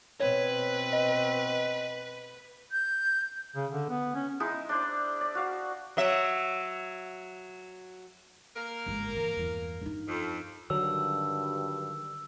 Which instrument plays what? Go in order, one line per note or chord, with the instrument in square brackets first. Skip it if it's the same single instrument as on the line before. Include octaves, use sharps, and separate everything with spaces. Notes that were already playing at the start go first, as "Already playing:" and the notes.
[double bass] B2 C4 [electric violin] B4 [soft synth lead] C#5
[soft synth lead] D#5
[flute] G6
[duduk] C#3
D3
B3
C#4
[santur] G#3 D#4 E4 G#4
D4 C5 D5
D5
F#4 F5
[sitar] F#3 E5
[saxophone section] A#3 A#4
[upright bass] G1 G#2
E3
E2 G2
G2 D#4
[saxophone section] F2
[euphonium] G2 [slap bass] D3 D#3 [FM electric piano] F#3 [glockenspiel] E6